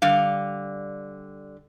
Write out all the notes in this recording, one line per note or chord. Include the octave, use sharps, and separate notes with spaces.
D3 G3 F5